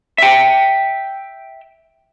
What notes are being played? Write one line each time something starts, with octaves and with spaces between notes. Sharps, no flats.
E5 G5